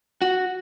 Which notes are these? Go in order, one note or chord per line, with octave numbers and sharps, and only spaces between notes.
F#4